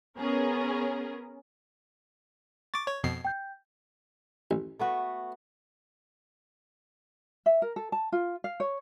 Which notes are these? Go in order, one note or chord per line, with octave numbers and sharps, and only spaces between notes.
B3 C#4 G#4 A#4
C#6 D6 A6
C#5 G#6
F2 B2 C7
G5 G6
A1
A3 B3 F#4
E5
A#4
A4
A5
F4
F5
C#5